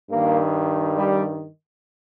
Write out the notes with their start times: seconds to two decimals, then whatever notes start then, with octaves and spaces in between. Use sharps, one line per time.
0.10 G2 D#3 A#3
0.96 G3